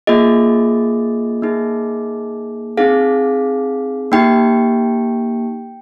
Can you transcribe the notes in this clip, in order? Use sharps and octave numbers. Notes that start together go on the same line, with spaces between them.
A#3 F4 G#4 D#5
A#3 D#4 G#4
C4 D#4 G#4 F5
A#3 D#4 G4 G5